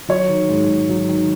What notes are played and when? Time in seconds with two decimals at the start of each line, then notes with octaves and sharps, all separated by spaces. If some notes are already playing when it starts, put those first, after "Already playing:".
0.09 F#3 C#5
0.28 D#3
0.49 G#2
0.69 G#2
0.89 F#3
1.09 D#3